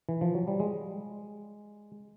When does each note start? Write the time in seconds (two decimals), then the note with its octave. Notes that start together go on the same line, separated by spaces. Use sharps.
0.09 E3
0.21 F3
0.35 F#3
0.47 G3
0.60 G#3